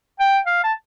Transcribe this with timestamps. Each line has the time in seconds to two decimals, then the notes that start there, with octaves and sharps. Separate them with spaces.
0.20 G5
0.46 F5
0.63 A5